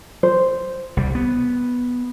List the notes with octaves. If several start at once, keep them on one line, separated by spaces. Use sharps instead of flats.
C5
C2 G3
B3